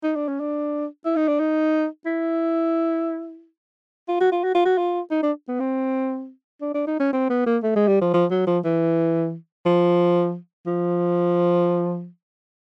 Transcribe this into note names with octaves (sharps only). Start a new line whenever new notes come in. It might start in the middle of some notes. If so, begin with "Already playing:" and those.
D#4
D4
C#4
D4
E4
D#4
D4
D#4
E4
F4
F#4
F4
F#4
F4
F#4
F4
D#4
D4
B3
C4
D4
D4
D#4
C#4
C4
B3
A#3
A3
G#3
G3
F3
F3
F#3
F3
E3
F3
F3